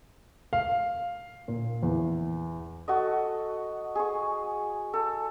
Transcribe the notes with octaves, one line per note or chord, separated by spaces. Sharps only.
F5
A#2
E2
F#4 A4 D#5
G#4 C#6
A4